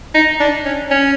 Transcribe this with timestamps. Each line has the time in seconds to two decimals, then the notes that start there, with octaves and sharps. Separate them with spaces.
0.14 D#4
0.40 D4
0.65 C#4
0.91 C#4